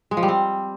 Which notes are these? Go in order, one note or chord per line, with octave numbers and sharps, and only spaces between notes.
G#3
F3
G3
C4